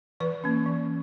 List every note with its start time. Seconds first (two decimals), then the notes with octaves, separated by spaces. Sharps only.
0.20 E3 B4
0.44 A#3 C#4
0.66 E3